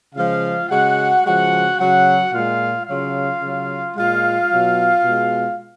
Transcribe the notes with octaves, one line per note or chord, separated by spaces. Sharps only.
C#3 F3 G#3 F4 F5
C#3 G#3 F#4 F#5
C#3 F3 G#3 F#4 F#5
C#3 F#3 F#4 F#5
A#2 G#3 F4 F5
C#3 F#3 F4 F5
C#3 F#3
A#2 G#3 F4 F5
B2 F#3
B2 G#3